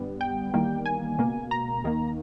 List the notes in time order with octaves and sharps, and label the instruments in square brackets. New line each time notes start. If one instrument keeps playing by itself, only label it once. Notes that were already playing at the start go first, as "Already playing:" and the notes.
Already playing: [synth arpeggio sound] G1 G2 G3 B3
G5
E2 D#3 G3 A#3
G#5
C#2 B2 A#3
A#5
D#2 D#3 A#3